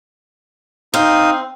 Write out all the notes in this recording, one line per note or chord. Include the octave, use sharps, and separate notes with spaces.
C4 D#4 F5 D#6